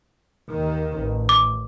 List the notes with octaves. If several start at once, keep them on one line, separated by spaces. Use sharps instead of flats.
D#2 D#3
A1
D6